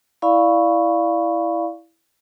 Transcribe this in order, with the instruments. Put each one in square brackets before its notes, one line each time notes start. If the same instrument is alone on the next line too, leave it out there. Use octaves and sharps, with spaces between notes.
[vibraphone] E4 D5 F5 B5 C#6